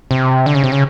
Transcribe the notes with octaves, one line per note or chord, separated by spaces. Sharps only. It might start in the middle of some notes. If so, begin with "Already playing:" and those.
C3
D3
C#3
C3
C#3